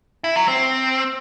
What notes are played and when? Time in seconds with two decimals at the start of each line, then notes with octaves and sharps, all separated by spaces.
0.24 E4
0.36 F#3
0.48 C4